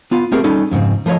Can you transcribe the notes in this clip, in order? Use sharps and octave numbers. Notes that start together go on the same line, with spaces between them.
B3 F4
A3 B3 C4 G4 G#4 A#4
G3 C#4 D#4 A4
F2 G#2 C#3 C4
F3 A3 B4 C#5 D#5